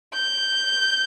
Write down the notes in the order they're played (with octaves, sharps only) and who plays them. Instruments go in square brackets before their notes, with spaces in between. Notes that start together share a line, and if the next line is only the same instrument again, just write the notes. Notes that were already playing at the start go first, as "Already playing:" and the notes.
[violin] G6